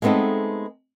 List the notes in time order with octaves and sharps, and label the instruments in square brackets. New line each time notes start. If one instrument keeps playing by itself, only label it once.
[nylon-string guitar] G#3 A3 B3 C4 D#4 A4